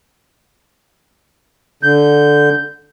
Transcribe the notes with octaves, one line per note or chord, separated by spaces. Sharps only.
D3 G6